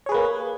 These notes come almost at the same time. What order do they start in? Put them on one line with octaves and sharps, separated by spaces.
C#5 G#4 B4 A#3